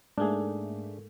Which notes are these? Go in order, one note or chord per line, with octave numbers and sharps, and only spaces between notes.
G#2 A3 A#3 D4 G#4